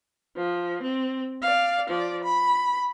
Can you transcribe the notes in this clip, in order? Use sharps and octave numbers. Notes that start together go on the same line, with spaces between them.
F3
C4
D5 F5
F3 D5
B5